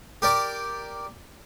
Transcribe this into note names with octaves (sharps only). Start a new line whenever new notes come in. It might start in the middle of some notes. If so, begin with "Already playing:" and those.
G4 A#4 D5